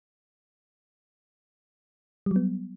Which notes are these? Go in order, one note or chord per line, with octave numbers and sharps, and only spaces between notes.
F#3 G3 B3